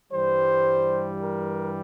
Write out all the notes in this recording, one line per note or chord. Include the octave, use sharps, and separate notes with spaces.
G2 E3 G3 C5
A#4